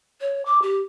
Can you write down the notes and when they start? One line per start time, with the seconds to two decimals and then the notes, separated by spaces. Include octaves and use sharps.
0.21 C#5
0.46 D6
0.62 G4